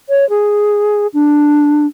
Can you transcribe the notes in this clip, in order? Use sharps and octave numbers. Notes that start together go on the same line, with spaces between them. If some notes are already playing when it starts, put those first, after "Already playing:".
C#5
G#4
D4